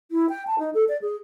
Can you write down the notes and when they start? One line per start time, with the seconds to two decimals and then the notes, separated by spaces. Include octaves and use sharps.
0.11 E4
0.29 G5
0.47 A5
0.59 D#4
0.74 A4
0.89 D5
1.02 G#4